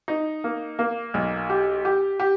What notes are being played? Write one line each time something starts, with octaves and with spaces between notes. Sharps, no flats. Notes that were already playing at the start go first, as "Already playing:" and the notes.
D#4
A#3
A#3
B1
G4
G4
G4